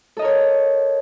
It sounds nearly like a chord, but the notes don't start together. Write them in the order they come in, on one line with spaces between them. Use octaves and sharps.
A4 D#5 A#4 C#5